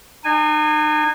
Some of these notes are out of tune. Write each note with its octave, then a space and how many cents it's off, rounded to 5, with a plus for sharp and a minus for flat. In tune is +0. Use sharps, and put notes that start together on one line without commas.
D#4 -40 G#5 -15